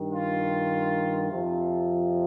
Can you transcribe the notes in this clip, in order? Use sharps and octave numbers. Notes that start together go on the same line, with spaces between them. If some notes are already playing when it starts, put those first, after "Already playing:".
Already playing: G2 D#3
F4
F2 C3 F3